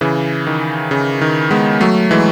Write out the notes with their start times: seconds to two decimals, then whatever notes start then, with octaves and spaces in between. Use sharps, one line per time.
0.01 C#3 E3
0.47 D#3
0.91 C#3
1.21 D#3
1.51 G#3 B3
1.81 F#3 A3
2.11 E3 G#3